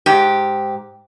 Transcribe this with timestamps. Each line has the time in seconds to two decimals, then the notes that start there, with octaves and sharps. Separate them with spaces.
0.06 G#2 G4